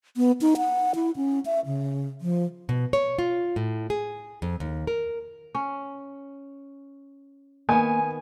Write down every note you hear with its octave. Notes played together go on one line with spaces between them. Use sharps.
B3
D#4
F#5
E4
C#4
E5
C#3
F3
B2
C#5
F4
A2
G#4
F2
D#2
A#4
C#4
D#3 A#3 B3 G#5